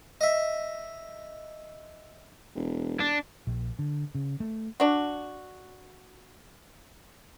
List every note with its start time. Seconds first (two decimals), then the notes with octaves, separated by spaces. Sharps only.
0.21 D#5 E5
2.55 E1
3.00 D4
3.47 A#1
3.79 D3
4.15 C#3
4.40 A3
4.80 D4 F#4